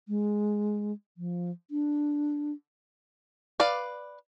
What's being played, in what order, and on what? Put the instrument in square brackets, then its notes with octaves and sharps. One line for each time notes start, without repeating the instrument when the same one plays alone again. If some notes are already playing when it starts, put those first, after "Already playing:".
[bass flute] G#3
F3
D4
[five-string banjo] B4 D5 F5